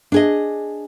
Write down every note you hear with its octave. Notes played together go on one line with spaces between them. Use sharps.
D4 G#4 D#5